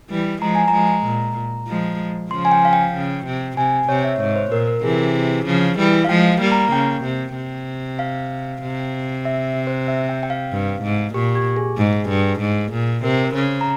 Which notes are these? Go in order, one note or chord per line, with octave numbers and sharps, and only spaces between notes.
E3 G3
F3 G#3 A#5
G#5
F3 G#3 A#5
A#2
F3 G#3
C#3 F3 C6
G#5
G5
F5
G5
C#3
C3
C3 G#5
C3 C#5
E5
G#2 C#5
C5
A#2 A#4
A#4
C3 E3 G#4
C#3 F3
E3 G3
F5
F3 G#3 G5
G3 A#3
A#5
C#3 G5
C3
C3
F5
C3
E5
C5
E5
G5
G5
F5
G2
G#2
A#2 G4
G4
G#4
G#2
G2
G#2
A#2
C3 A#4
C5
C#3
A#5